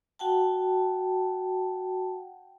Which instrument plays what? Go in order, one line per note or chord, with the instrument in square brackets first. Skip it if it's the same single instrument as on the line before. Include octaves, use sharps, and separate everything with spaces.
[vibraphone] F#4 F#5 G5 A5